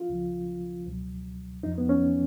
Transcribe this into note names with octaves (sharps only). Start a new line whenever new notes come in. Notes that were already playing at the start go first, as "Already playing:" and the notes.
Already playing: F4
C#2 C#3 F3
C#2 B2 F#3
F2 F3 D#4
B3
C#4